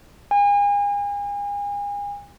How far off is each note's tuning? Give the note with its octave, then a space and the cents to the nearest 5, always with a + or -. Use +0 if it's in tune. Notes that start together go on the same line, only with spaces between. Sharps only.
G#5 -40